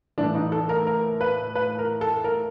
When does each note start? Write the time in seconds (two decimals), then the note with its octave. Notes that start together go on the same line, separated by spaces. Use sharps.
0.18 A2 E3 D4
0.35 D#4
0.52 A4
0.69 A#4
0.87 A#4
1.21 B4
1.55 B4
1.79 A#4
2.01 A4
2.24 A#4